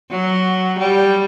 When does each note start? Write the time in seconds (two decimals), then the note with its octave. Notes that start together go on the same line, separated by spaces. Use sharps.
0.10 F#3
0.79 G3